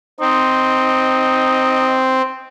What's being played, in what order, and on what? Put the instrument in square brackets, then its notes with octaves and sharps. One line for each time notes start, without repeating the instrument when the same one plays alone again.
[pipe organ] C4 [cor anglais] D#4